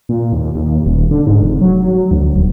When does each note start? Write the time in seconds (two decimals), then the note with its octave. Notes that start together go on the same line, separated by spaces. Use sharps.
0.09 A#2
0.33 D#2
0.55 D#2
0.86 D#1
1.11 D3
1.27 G#2
1.43 F1
1.61 F#3
2.11 D2
2.36 D#1